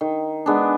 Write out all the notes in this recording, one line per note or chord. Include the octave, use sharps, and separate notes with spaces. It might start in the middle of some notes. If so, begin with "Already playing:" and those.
D#3
G#3 B3 D4